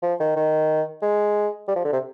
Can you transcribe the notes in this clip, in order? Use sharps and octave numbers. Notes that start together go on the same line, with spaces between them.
F3
D#3
D#3
G#3
G3
F3
D3
C3